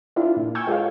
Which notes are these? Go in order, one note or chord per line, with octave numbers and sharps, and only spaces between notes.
D4 E4 F4
A#2
G5 G#5 C#6 E6 G6 G#6
G#3 F4 A4 C#5 F5